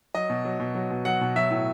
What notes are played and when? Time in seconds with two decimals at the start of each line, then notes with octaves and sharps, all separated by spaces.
0.15 F#3 D#5
0.30 B2
0.45 F#3
0.60 B2
0.75 F#3
0.90 B2
1.05 F#3 F#5
1.21 B2
1.36 F#3 E5
1.50 A2